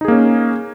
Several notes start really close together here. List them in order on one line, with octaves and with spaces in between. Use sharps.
D#4 G#4 A#3 C#4